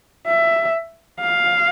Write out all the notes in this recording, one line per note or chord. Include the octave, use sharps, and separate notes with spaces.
E5
F5